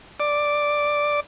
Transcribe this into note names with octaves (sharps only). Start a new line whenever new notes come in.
D5